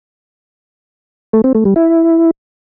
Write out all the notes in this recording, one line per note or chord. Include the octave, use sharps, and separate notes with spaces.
A3
C4
A3
G3
E4